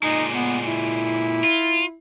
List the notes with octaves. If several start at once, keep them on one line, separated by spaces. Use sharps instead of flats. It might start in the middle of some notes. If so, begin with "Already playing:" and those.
A#2 G#3 D#4
B3
E4
F4